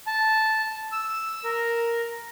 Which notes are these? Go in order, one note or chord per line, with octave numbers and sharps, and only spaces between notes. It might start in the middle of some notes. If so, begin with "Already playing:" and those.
A5
E6
A#4